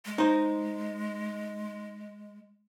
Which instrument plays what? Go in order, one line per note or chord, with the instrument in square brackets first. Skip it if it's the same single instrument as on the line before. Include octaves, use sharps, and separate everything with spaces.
[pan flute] G#3
[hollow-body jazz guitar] D#4 C5